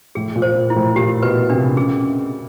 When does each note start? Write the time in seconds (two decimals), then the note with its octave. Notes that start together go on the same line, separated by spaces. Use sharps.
0.15 A2 G#4
0.36 A#2
0.42 C5
0.56 A#2
0.70 E4
0.76 A2
0.96 A#2 G4
1.23 B2 B4
1.50 C3 D4
1.76 C#3 G#4